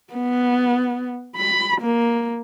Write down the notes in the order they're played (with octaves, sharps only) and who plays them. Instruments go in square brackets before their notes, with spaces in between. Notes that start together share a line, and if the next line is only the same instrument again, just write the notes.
[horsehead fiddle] B3
B5
A#3